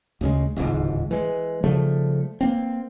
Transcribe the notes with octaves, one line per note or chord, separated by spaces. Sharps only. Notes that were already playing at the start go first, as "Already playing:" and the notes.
D2 C#3 G#3
D1 G#1 C#2 G#2
E3 G#3
C#3 F3 G3 A3
A#3 C4